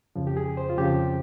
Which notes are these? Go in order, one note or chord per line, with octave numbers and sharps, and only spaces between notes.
F2 C#3 F3
G4
G#4
C5
F4
F2 C#3 F3 G4